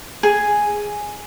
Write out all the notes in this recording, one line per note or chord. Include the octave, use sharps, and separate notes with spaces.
G#4 G#5